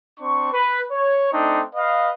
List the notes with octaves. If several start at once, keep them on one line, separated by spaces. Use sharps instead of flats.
C4 D4 C#6
B4
C#5
A3 C4 D4 D#4
B4 D#5 F5